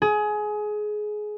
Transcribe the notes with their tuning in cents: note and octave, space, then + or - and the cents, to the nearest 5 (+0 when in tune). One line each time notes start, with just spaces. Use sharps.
G#4 +20